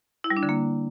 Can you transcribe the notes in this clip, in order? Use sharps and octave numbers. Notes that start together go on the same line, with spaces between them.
E4
G3
D4
D3
A#3